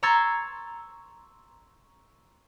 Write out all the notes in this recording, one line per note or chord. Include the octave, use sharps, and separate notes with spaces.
A#5 C6 C#6 E6 G#6 A6